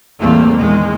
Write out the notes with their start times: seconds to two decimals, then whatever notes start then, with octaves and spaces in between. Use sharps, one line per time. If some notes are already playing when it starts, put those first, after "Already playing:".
0.19 A1 E2 G3 A3 A#3 C4
0.57 A#1 E2 D#3 G#3